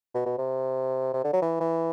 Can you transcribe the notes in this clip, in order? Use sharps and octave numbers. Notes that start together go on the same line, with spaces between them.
B2
B2
C3
C3
D3
F#3
E3
E3